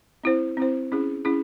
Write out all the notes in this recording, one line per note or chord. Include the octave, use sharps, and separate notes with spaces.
C4 E4 C5
C4 E4 C5
C#4 E4 G#4
C#4 E4 G#4